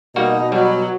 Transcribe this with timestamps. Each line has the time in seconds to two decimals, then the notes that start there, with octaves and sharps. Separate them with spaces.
0.16 B2 G3 A#3 D#4 F#4
0.52 F#3 G3